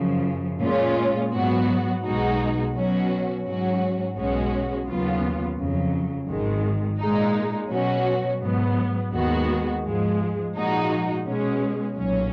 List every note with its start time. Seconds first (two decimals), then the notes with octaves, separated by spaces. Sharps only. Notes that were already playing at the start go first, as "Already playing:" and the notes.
Already playing: F#2 C#3 F3
0.62 A#2 G#3 C#4 F4
1.32 G#2 F#3 B3 F#4
2.03 B1 B2 G#3 D#4 F#4
2.75 B2 F#3 C#4 F#4
3.44 G#2 F#3 C#4 F#4
4.15 B1 B2 G#3 C#4 F#4
4.87 D#2 C#3 F#3 B3 F4
5.57 F2 C#3 F#3
6.28 G#1 G#2 D#3 G#3
6.99 A#2 G#3 D#4
7.70 B2 F#3 C#4 F#4
8.41 G#2 F#3 B3
9.13 D#2 D#3 G#3 B3 F#4
9.84 G#2 F3 G#3
10.54 A#2 F3 G#3 D#4 F#4
11.24 B2 G#3 C#4
11.95 B1 A#2 F#3 C#4